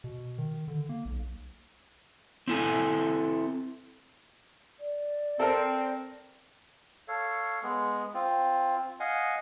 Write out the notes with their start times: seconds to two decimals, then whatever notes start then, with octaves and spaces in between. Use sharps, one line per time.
0.04 B2
0.38 D#3
0.68 D3
0.89 A#3
1.05 B1
2.48 C4 E4 A4 G#5
4.80 D5
5.40 C4 A4 A#4
7.08 A4 C#5 F5
7.63 G#3 B3
8.14 C4 F4
9.00 D#5 F5 F#5 G#5